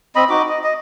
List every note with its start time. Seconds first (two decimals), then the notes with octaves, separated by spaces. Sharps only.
0.16 C4 D#5 B5
0.30 D#4 F#4 D6
0.49 D#5
0.64 D#5